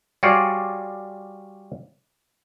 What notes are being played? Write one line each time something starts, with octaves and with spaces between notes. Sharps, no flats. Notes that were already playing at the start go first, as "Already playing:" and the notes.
G3 F4 F#4 G#4 C#5 D5